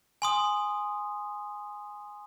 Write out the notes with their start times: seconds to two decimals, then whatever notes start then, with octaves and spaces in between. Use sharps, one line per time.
0.22 G#5 C6 D#6